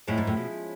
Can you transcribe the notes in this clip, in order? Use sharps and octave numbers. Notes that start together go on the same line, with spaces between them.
A2 F3 G#3 C#4 E4
G#2
A2
B2